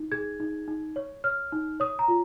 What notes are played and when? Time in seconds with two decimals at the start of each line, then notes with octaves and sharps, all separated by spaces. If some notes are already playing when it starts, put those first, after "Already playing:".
Already playing: D#4
0.12 G#4 G#6
0.40 D#4
0.68 D#4
0.96 C#5
1.24 C#5 F6
1.52 D#4
1.80 C#5 D#6
1.99 A#5
2.08 F4